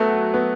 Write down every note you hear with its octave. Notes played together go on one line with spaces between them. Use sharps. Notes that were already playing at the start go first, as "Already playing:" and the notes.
Already playing: F#3 A3 B3 F#4
B3